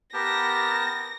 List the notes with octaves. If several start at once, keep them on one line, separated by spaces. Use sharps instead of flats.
B3 G4 A#4 A5 A#6